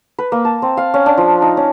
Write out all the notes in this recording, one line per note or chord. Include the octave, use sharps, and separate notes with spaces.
B4
A#3
A5
C4
F5
C#4
D4
F3
D#4
C#4